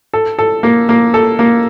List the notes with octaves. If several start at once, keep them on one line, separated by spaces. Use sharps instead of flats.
A4
A4
A#3
A#3
A4
A#3